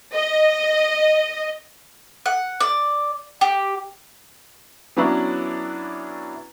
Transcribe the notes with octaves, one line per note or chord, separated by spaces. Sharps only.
D#5
F#5
D5
G4
E3 F#3 B3 C#4 D4 E4